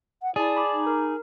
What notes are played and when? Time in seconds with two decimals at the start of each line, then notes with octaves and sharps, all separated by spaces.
0.22 F#5
0.36 E4 G#4 D5 A5
0.57 B5 D6
0.72 D#4
0.87 A#4